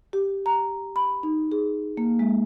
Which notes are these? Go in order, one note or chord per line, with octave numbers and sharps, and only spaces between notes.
G4
A#5
B5
D#4
G#4
A#3
G#3